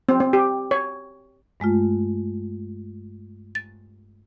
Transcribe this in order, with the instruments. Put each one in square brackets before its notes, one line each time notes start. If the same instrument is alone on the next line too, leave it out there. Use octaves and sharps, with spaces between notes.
[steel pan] C4
C4
G4
C#5
[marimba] G2 G#3 A3 F4
A6